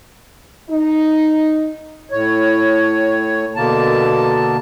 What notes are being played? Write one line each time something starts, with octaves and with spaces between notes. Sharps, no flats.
D#4
A2 C#5
B2 D3 A#3 A5